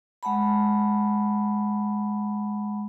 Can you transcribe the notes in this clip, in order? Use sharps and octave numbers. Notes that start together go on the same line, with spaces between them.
G#3 F#5 A5 B5